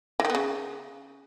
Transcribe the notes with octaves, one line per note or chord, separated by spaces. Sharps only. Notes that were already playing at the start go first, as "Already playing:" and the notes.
E3
D#3
B3
C#3